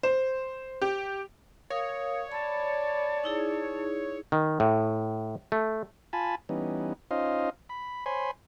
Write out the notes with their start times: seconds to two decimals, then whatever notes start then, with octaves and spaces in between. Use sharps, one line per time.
0.03 C5
0.82 G4
1.70 A#4 C#5 F5 D#6
2.32 D5 A5 B5
3.24 D#4 E4 G#4
4.32 D#3
4.60 A2
5.52 A3
6.13 F4 G#5 A5 B5
6.49 E3 G3 B3 C#4 D#4
7.11 C#4 D#4 F4 C5 D#5 F5
7.69 B5
8.06 C5 C#5 G#5 B5 C6